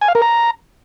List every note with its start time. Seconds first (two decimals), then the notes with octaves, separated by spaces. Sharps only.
0.01 G#5
0.08 F5
0.15 A#4
0.22 A#5